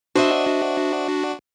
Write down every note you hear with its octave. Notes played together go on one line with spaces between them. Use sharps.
D4 F#4 C5 D#5 E5